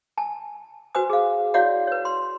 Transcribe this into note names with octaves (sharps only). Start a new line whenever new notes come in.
G#5 A5
F#4 B4 C5 G#5 D#6
G#4 F5
E4 F#4 C#5 D5 F5 F#5
B4 C#5
C6